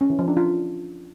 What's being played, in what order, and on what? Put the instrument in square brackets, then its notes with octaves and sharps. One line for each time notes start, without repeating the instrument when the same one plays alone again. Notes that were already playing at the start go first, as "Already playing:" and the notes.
[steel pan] C#4
E3
F3
D4
F4